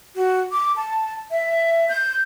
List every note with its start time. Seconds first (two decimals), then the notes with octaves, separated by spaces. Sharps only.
0.15 F#4
0.52 D6
0.76 A5
1.31 E5
1.89 G6